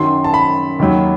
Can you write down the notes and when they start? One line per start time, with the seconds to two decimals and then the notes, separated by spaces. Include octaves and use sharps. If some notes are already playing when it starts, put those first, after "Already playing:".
Already playing: F#2 D#3 F#3 C6
0.24 A5
0.34 B5
0.79 D#2 D#3 F#3